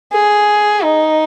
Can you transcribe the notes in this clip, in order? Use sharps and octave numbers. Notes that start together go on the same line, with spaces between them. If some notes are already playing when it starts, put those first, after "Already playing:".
G#4
D#4